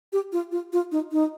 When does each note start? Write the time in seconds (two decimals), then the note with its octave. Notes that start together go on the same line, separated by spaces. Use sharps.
0.13 G4
0.33 F4
0.52 F4
0.73 F4
0.92 D#4
1.12 D#4